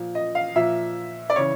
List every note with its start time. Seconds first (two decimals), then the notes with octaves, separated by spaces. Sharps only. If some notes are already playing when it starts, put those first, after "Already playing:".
Already playing: A#2 F3
0.15 D#5
0.35 F5
0.56 A#2 F3 E5
1.30 D5
1.36 C#3 E3 C#5